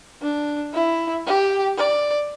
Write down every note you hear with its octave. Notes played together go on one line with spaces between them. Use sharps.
D4
E4
G4
D5